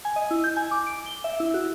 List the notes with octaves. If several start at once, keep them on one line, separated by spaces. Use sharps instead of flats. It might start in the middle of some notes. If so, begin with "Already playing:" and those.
G#5
D#5
E4
G6
G#5
D6
D7
G7
E5
E4
F#4